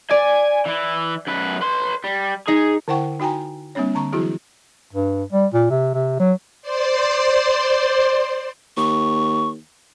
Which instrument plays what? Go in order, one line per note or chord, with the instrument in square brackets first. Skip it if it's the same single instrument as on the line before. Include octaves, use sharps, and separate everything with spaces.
[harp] D5 [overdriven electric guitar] G#5
[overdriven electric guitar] E3 E4
F#2 B4
B4 C6
G3
[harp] D#4 [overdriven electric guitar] G#4
[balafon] D3 E4 C5 F#5 G5 C#6
D#4 F#4 G5 G#5 A#5
G3 A#3 C4 D4 C#5
D3 A#5 C#6
E3 F#3 E4 F#4 G#4
[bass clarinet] G2
G3
A#2
C3
C3
F#3
[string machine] C5 D5 C6
[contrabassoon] D#2 [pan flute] C#6